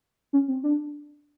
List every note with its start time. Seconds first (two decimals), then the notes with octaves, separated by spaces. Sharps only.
0.33 C#4
0.48 C4
0.64 D4